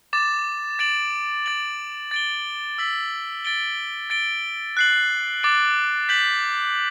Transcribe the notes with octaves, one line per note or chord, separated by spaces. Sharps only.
D6 A6 E7
A6 D7 F#7
A6 D7 F#7
A6 D7 G7
E6 B6 F#7
A6 D7 G7
A6 D7 G7
F#6 C7 F#7
D6 A6 D7
G6 B6 F#7